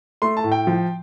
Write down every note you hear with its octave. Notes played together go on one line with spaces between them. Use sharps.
A3 C6
A5
A2
G5
F3